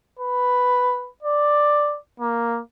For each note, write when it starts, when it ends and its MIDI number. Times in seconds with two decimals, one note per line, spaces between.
0.19 1.09 71
1.23 1.97 74
2.20 2.60 58